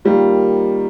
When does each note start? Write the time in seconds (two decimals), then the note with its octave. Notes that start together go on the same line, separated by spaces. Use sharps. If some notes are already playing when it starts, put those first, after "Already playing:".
0.05 D#3 G3 A#3 F4